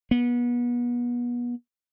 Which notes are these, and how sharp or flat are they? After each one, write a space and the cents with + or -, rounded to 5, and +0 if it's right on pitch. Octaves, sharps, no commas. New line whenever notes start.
B3 -30